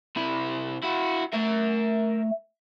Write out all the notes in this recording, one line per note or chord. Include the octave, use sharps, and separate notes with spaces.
C3 E4
E4 F#4
A3 A#4 E5